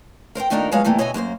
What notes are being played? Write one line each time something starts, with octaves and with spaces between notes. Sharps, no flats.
A#4 C5 F5 G5
A#2 D#3 A3 D4 D#4 A#4
F3 F#3 G#3 B3 C#5 F5
C3 E3 G3 A3 A#3
B2 D3 C#5 D#5 E5 G#5
F#2 A#3 G4 C5